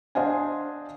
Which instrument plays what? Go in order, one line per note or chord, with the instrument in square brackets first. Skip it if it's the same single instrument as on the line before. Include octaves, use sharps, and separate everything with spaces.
[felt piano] D4 C5 D#5 F5 F#5 G#5